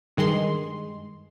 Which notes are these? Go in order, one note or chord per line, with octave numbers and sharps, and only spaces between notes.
G2 D#3 G#3 C6